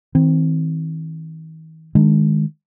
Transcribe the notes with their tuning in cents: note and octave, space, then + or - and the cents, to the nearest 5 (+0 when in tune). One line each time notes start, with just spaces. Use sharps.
D#3 +45 C4 +0
D#3 -5 G#3 +5 D4 +0